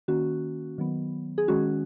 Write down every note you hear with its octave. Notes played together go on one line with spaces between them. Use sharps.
D#3 A#3 C#4 F#4
D#3 F#3 B3
G#4
D#3 G#3 C#4 F#4